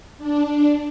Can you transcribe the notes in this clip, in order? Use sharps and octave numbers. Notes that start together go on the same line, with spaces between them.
D4